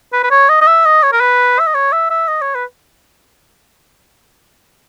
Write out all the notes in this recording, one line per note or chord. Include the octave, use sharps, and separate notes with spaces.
B4
B4
C#5
D#5
D#5
E5
D#5
C#5
A#4
B4
E5
D#5
C#5
E5
E5
D#5
C#5
B4